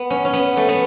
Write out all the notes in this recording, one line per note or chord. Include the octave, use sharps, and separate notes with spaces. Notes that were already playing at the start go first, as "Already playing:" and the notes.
Already playing: B3
C#4
C#4
B3
A3
B3